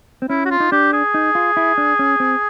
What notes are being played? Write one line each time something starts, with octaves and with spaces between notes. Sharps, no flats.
C4
C#4 E4
F#4
F4
D#4
D4 G4
G#4
D#4
F4
E4
D4
C#4
C4